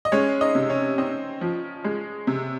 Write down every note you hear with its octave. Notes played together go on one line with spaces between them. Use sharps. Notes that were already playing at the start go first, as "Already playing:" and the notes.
D#5
G#3 C#4 C#5
D#4 D#5
C3
C#4 C#5
C4 D#4 D#5
F3
G#3
C3